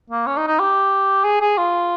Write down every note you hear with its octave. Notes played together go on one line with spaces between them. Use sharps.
A#3
C#4
D#4
D#4
G4
G#4
G#4
F4